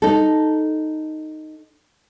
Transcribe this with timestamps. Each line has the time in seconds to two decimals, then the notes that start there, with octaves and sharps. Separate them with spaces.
0.02 D#4 A4